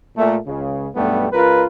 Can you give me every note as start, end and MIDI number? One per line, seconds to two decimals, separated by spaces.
0.16 0.36 46
0.16 0.36 57
0.46 0.88 37
0.46 0.88 49
0.95 1.26 35
0.95 1.26 43
0.95 1.26 55
0.95 1.26 57
0.95 1.26 59
1.32 1.64 37
1.32 1.64 65
1.32 1.64 70
1.32 1.64 71